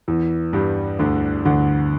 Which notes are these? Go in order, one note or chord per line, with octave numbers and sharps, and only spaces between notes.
E2 E3
G2 G3
D2 D3
D2 D3